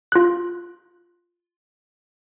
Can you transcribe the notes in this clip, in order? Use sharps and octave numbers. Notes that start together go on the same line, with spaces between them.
F4 F#6